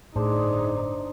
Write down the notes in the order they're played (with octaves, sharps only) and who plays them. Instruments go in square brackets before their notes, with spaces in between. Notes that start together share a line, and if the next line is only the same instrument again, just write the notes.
[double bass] G1 D#4 [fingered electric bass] A2 [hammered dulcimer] D4 C5 D6 [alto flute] G#4